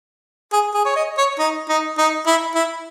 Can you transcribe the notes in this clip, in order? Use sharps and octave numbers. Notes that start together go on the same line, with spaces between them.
G#4
G#4
C#5
D#5
C#5
D#4
D#4
D#4
E4
E4